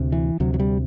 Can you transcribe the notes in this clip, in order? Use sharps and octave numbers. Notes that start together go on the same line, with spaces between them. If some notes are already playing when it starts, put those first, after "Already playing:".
Already playing: D2 C3
E3
D2 C3 F#3
F#3
G3